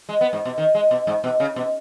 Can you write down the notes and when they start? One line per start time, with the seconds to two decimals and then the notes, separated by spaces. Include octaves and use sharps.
0.09 G#3
0.21 B3
0.33 G#2
0.45 B2
0.58 D#3
0.75 G#3
0.91 B2
1.07 G#2
1.24 B2
1.40 C#3
1.56 B2